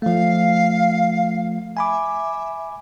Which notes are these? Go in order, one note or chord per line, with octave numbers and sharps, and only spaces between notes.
F3 A3 F5
E5 G#5 B5 D6